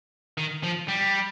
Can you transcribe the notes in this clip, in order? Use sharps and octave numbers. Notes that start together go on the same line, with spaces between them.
D#3
F3
G3